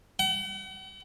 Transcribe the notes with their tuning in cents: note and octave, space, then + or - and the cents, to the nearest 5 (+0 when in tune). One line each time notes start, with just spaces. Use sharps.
F#5 +45